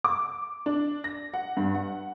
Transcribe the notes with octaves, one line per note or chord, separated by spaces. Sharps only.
D6
D4
A#6
F#5
G2
F#5